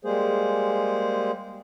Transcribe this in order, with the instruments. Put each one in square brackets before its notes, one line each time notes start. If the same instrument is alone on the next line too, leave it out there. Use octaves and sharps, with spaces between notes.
[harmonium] G3 G#3 A#3 G#4 C5